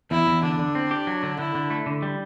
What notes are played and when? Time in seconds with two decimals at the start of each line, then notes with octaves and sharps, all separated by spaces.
0.11 E2 E4
0.27 E2
0.43 D3 D4
0.59 D3
0.75 C4
0.91 G4
1.07 F#3
1.23 D3
1.39 D3 E4
1.55 D3
1.70 A3
1.86 D3
2.02 G3